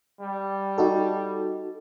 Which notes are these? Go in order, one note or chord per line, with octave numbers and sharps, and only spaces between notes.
G3
D#4 F#4 A4